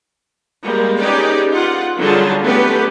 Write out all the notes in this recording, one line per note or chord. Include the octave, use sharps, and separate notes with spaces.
G3 G#3 A#3
C#4 D#4 G4 G#4 B4 D5
F4 F#5
D3 F#3 G3 F4 G#4 A5
A3 B3 C#4 G4 A4 B4